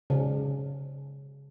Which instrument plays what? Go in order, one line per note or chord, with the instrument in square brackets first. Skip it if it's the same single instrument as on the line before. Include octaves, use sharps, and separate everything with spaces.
[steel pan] C#3